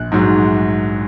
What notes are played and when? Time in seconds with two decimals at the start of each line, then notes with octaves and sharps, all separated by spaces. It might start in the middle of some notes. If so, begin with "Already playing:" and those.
Already playing: A#1 F#6
0.12 G#2 F#3